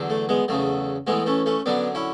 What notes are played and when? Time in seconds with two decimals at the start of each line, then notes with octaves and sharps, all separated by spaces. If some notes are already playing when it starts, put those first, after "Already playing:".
Already playing: E2 D3 F#3
0.10 A3
0.29 G#3 B3
0.48 E2 C#3 F#3 A3
1.07 A2 E3 G#3 B3
1.26 A3 C#4
1.46 A3 C#4
1.66 F#2 D3 F#3 B3 D4
1.95 C#4 E4